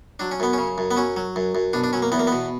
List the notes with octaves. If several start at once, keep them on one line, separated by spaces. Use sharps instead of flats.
F#3 D4
C#4
F#2 B3
C#3 C#4
F#2
B3
F#3 C#4
F#3
F#2
F#2
B2 D4
D4
F#3 C#4
A#3
E2 B3
A#3
B3
B2